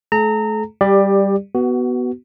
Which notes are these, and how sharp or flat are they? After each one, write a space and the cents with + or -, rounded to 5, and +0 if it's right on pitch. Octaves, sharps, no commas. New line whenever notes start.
A3 -35 A4 -45 A#5 -25
G3 +0 G4 +20 D5 +15
B3 +0 F#4 +25